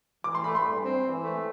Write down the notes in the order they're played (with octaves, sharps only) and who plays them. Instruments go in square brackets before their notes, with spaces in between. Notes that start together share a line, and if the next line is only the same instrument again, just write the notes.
[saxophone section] E3 [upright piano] D6
[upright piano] C6
[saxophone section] A3 [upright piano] B5
[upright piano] C6
[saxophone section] G2
C4
E3
A3